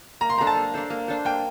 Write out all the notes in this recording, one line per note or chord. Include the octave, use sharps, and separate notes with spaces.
A#3 A#5
C6
D4 A4 C5 A#5
A5
A#3
D4 A4 C5
A#3
D4 A4 C5
A#3 G5